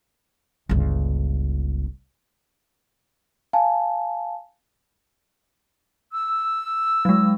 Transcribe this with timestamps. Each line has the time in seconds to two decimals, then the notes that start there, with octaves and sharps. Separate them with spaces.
0.69 G1 C#2
3.53 F5 G#5 A5
6.12 E6
7.05 F#3 G#3